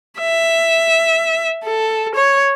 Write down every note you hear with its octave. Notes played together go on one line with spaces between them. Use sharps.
E5
A4
C#5